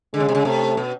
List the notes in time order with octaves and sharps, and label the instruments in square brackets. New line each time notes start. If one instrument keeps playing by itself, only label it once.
[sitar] D3 [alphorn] G#3
[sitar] C#3
C3
C#3
[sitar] C3 [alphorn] A3
[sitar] B2